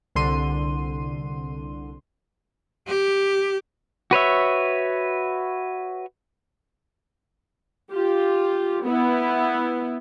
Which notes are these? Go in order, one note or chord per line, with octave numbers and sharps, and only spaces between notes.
C2 D3 C6 D#7
G4
F#4 B4 C#5 E5
F4 G4
B3 E4